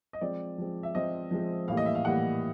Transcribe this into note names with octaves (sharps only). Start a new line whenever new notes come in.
D#5
F3 G#3 C4 D5
F3 G#3 C4
E5
F3 G#3 C4 D#5
F3 G#3 C4
A2 E3 G3 A#3 F5
D#5
E5
F5
A2 E3 G3 A#3 F#5